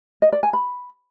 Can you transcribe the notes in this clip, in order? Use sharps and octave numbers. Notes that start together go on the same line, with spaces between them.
D#5
D5
G#5
B5